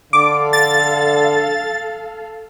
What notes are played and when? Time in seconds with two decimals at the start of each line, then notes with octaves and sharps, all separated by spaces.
0.13 D3 A4 F5 D6
0.53 A6